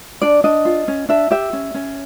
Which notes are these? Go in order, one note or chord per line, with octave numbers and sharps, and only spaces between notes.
D4 D5
D4 D#5
F4
C#4
D4 E5
G4 E5
C#4
C#4